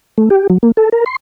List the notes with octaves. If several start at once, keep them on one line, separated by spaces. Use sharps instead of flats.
A3
G4
F#3
A#3
A4
A#4
C6